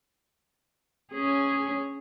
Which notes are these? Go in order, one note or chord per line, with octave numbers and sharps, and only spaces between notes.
C#4 G#4